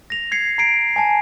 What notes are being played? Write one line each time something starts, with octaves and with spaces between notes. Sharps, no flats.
A#6 F7
G#6 C7 C#7
A#5 C7 D7
G#5 A5